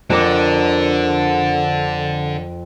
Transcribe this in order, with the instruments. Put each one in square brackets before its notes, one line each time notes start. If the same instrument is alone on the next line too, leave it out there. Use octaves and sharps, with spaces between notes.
[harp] F2 A#4 D6 [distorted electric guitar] D3